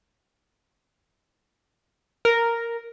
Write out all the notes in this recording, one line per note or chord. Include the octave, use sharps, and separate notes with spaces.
A#4